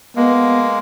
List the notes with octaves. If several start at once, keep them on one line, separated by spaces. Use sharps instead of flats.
G#3 A#3 B3